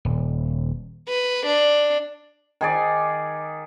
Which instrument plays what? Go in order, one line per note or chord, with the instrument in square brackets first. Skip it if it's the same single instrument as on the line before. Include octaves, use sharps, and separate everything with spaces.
[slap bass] D#1
[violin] B4
D4
[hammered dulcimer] D#3 G#4 D5